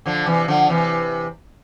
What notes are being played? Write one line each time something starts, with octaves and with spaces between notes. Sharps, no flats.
D3 F3
C3 E3
D3 F3
C3 E3